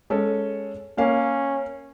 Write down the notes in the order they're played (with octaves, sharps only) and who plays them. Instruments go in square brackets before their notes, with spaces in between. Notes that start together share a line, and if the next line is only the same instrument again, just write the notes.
[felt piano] G#3 C#4 A4
[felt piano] A#3 F5 [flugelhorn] C#4